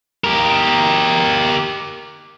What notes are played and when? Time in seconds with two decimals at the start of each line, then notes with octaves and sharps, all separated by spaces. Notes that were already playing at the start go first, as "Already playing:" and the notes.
0.24 G4 A#4